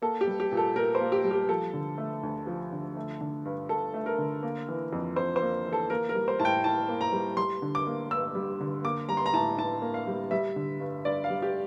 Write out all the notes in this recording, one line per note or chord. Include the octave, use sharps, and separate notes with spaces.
A#3 A4
G4
G3
G4
A#2
A4
A#2 A#4
C5
A#3
G4
G3
G4
F3 A4
D3
A3
D2
F3
D3
A3
D3
G2
G2 A4
A3
A#4
D3
A#3
E3
F2
F2 C5
C5
A#3
E3
A4
A#3 A#4
A#4
G3
C5
A2 A5
G5
A2 A5
A#3
A#5
G3
G3 C6
D3
D6
A#3
G2 E6
G3
D3
A#3 D6
G3 A#5
C6
A#5
A2 A5
A2 A5
A#3
F5
G3
G3 E5
D3
G2
G2 D5
F5
G3
G4